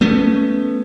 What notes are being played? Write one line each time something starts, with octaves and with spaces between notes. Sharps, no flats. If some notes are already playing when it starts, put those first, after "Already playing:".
A3 B3 C#4